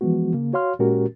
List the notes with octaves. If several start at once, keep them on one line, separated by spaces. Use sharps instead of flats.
E3 F3 G#3 B3 F#4
C#3 A#3
F#4 C#5 F5 C6 F6
A#2 G#3 C#4 F#4 G4 A#4